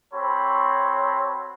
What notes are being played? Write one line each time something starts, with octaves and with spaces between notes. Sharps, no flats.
C4 F#4 A4 C#5 B5